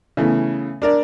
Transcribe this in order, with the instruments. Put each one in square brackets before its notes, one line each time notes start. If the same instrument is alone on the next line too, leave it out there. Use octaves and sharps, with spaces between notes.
[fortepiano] C#3 E3 A3 B3
D4 A#4 D5